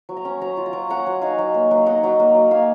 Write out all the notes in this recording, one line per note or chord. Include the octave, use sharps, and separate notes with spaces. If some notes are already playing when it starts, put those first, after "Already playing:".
F#3
A#5
C#4
F#3 A#5
F4
A#5
F#3
C#4 F#5 A#5
F#3
D#4 F5 G#5
F#3
A#3
F#3
D#4 D#5 F#5
F#3
A#3
F#3
A#3 F5 G#5